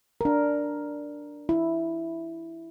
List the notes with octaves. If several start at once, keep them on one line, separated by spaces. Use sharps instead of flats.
D4 A#4
E4